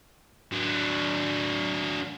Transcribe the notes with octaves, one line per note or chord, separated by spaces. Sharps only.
F#3 D4